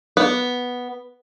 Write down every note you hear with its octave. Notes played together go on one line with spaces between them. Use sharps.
B3